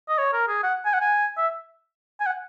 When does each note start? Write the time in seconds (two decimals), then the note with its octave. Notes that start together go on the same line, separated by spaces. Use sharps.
0.09 D#5
0.18 C#5
0.33 A#4
0.48 G#4
0.63 F#5
0.85 G#5
0.93 F#5
1.01 G#5
1.37 E5
2.20 G#5
2.26 F#5